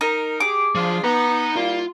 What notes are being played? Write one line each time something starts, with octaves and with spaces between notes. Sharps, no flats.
D#4 A#4
G4 G#4 D6
F3 D4 F4 G#4
B3 D#4 A#5
G3 A#3 E4 F4